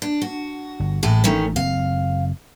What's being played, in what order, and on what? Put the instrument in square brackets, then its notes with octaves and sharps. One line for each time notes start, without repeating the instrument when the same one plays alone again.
[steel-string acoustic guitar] D4
F#4
[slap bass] G1
[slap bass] A1 [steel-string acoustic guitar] A2 G#3 A4
[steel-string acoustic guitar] D#3 A3 C#4
[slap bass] F#1 C4 [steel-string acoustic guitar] F5